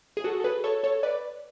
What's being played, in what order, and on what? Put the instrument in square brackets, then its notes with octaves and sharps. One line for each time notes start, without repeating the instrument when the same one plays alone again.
[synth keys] G#4
F#4 A4
A4
G#4 B4
A4 C#5
A4 C#5
B4 D5